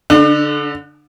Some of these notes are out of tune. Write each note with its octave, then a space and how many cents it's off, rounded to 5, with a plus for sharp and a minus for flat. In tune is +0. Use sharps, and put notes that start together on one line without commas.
D3 -25 D4 +35